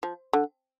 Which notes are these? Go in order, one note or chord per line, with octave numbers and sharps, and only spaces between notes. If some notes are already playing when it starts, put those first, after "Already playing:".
F3
D3